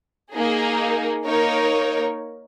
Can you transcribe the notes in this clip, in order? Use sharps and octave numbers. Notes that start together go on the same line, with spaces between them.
A#3 D#4 G#4
A#3 D#4 A#4 C#5